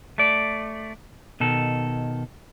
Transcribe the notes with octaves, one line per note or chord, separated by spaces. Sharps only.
A3 D5
B2 D#3 A4